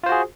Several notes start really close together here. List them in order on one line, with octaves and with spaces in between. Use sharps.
F4 C5 F#4 G#4